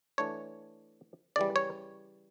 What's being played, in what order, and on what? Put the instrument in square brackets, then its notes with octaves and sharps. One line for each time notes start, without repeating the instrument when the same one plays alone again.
[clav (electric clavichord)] E3 A3 D4 C#5
C#3 E3 G3 D5
C#5